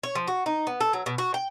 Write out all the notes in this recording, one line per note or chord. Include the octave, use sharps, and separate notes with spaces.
C#5
F3
F#4
D#4
B3
A4
F#3
B2
F#4
G5